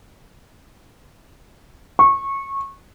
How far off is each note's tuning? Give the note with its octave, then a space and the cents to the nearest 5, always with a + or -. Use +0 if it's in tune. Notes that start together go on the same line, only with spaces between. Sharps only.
C#6 -20